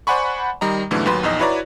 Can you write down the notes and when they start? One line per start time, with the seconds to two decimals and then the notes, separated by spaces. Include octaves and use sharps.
0.07 C5 D5 F#5 G#5 B5 C#6
0.61 D#3 G3 D#5 A#5
0.91 G#2 B2 D3 E3 F#3 A3
1.06 D#2 F#3 B4 C6
1.23 A#1 E2 D#4 D#5
1.39 E4 F#4 B4 C#5 D5 A#5